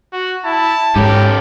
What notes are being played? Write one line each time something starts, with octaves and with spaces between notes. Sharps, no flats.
F#4
E4 A5
G#2 C#4 G4 A4 A#4